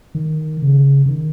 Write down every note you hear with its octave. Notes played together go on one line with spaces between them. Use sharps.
D#3
C#3
C#3
D#3